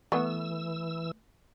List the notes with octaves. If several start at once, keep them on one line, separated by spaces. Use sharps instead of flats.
E3 A3 B3 E6